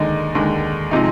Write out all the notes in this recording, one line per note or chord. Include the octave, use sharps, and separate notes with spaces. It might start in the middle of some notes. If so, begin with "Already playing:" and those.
Already playing: D#2 D3 G#3 D#4
D#2 D3 G#3
C3 F3 G#3 D#4